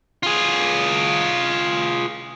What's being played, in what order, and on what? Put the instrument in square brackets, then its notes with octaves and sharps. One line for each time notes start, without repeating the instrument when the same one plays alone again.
[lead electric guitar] F4 G#4